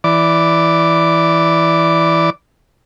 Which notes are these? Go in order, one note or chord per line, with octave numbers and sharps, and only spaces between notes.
E3 D5 D6